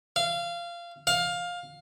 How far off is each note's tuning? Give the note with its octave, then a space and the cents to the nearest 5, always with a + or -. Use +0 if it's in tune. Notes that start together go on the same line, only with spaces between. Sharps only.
F5 -20
F5 +15